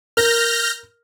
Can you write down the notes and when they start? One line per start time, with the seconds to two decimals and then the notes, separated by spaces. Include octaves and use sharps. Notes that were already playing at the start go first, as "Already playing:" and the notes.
0.17 A#4 F6 G6 A#6